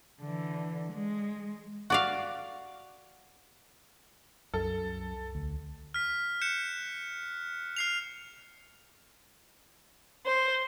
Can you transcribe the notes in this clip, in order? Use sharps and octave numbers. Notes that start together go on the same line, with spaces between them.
D3 E3
G#3
F#4 D5 F5
C2 F#2 A4
D2
F6 B6
F#6 G6 C#7 E7
F6 C7 F7
C5